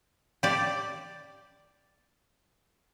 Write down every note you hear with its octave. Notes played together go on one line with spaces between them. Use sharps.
G4 D5